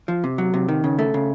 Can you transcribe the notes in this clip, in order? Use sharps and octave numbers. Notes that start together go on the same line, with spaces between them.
F3
C3
F#3
C3
D#3
C#3
A3
C#3